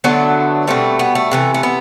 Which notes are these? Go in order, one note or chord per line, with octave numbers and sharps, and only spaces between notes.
D3 F#3 A3 B3 D4
B2 G3 A3 C4
B3
A3
C3 E3 A3
A3
B3